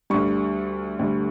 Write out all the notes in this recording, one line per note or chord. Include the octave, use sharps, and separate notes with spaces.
D2 D3 G3 C#6
D2 D3 G3